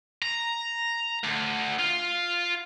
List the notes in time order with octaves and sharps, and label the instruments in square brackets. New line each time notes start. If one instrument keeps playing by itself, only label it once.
[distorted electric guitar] A#5
D2
F4